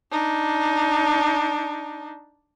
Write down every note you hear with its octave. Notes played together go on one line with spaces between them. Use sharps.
D4 D#4